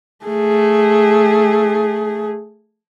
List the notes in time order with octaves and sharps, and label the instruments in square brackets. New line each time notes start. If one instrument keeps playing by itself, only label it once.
[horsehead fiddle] A3 G#4